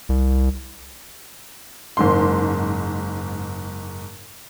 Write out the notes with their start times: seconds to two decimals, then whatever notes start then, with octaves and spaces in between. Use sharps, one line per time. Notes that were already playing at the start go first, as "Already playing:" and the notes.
0.09 C2
1.97 F#1 G#2 C6